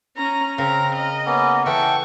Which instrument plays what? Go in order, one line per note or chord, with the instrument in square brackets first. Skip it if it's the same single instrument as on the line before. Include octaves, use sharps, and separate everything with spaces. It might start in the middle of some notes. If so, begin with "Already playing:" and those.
[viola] C#4 A#5
[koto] C#3 [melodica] C4 A#4 [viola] A#5
[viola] D#5
[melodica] A#3 B3 C#4
[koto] E3 [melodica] A4 F#5 G5 [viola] C#6